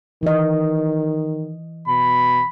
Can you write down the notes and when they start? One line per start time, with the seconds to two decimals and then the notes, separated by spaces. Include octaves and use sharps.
0.23 D#3 E3 D#5
1.88 B2 B5